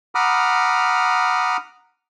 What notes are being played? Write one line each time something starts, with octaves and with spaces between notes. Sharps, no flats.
F#5 A#5 B5 D6 D#6 F6